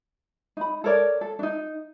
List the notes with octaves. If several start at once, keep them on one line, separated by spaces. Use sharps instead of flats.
D#4 B5
A4 A#4 C#5 D5
A4
D4 D#4